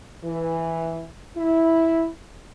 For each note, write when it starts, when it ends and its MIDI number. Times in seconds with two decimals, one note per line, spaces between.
0.24 1.04 52
1.37 2.07 64